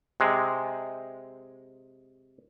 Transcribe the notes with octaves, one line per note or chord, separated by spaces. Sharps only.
C3 G#3